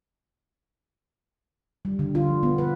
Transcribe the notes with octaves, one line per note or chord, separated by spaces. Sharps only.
G3
D3
F4
F3
B3
B4